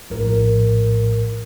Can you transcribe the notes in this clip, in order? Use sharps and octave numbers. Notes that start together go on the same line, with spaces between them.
A#1 A2 A#4